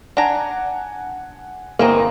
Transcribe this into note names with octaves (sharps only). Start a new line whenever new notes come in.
D4 F#5 G#5 A#5
G1 E3 A#3 C4 D#5 A#5